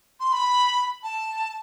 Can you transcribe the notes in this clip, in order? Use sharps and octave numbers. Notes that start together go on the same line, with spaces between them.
C6
B5
A5